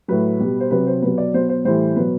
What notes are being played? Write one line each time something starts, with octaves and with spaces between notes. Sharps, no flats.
A2 F#3 B4
B2 G3
C5
C3 F#3 B4
C5
B2 F#3 B4
D5
B2 F#3 C5
C5
A2 E3 G3 C5
B2 F#3 B4